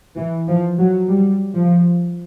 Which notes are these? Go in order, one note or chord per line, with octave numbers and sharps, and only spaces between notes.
E3
F3
F#3
G3
F3